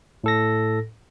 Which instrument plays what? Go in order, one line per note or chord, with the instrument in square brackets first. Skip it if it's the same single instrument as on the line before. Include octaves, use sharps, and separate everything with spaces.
[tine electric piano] A2 A4 A#6